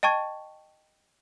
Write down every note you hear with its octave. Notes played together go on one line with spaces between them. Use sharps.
D#5 G5 A5 C#6 G#6